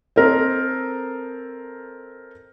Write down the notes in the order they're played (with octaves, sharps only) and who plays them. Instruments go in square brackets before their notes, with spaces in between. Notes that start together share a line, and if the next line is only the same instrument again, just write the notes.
[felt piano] C4 A4 A#4 C5 D#5